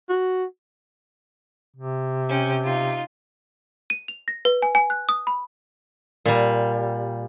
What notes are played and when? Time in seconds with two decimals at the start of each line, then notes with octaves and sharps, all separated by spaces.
0.09 F#4
1.76 C3
2.29 C#4 G5
2.64 D#4 F4
3.90 D#7
4.08 F7
4.28 A#6
4.45 B4
4.62 G#5
4.75 G#5
4.90 F#6
5.09 D#6
5.27 B5
6.25 A#2 G3